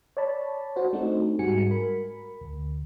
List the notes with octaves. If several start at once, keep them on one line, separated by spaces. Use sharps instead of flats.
C#5 D5 A5 B5
F#4 C5
A3 C4 D4 D#4 F#4
G#2 G3 G#3 F#4 G#5 C#7
A#4 B5
D2